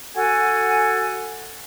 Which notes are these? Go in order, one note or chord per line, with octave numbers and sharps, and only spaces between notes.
F#4 A4 F#5 G#5